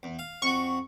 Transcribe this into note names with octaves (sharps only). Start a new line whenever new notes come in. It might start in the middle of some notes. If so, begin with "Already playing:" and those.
E2
F5
F2 F#4 C#6